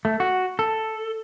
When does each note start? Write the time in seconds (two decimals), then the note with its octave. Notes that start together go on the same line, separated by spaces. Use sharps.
0.05 A3
0.20 F#4
0.59 A4